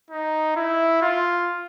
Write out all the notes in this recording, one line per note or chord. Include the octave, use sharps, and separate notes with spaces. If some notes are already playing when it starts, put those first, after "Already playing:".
D#4
E4
F4